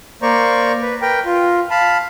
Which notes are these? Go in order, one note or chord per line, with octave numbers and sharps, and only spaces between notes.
A#3 C5 D5 A#5 C#6
B4
A#4 B4 G5
F4
F5 A5 B5